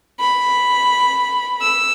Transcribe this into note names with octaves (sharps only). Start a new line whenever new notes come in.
B5
E6